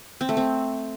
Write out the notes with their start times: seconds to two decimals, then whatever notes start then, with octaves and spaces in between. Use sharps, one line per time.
0.21 C4
0.29 A3
0.37 C4